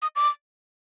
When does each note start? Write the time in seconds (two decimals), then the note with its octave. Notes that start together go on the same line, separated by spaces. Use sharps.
0.02 D#6
0.16 D6